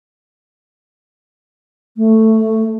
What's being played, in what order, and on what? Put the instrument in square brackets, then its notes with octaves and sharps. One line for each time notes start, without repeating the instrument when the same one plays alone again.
[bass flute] A3